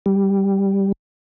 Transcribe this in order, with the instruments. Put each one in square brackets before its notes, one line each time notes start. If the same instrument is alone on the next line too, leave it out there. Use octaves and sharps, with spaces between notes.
[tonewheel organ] G3